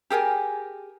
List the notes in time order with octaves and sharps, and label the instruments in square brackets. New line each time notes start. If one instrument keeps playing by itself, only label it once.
[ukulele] G4 G#4 A#4 G#5